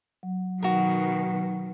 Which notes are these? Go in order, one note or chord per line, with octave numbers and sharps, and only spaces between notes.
F#3
B2 D#3 F#4 A#4